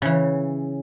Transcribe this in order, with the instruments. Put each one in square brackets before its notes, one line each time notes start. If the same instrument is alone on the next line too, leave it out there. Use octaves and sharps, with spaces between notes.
[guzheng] C#3 E3